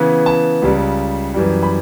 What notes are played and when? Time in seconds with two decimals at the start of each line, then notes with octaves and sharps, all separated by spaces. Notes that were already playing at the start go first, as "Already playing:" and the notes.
Already playing: C#3 E3 B3
0.26 A5
0.62 C#2 C#3 G3
1.34 F#2 E3 G3
1.63 B5